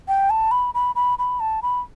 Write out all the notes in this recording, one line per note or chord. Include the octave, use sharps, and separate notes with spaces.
G5
A5
B5
B5
B5
B5
A5
B5